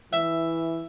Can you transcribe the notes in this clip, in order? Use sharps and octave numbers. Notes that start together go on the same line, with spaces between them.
E3 E5